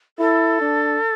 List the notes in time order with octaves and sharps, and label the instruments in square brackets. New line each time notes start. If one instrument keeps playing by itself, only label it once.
[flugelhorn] E4 [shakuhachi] A4
[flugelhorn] D4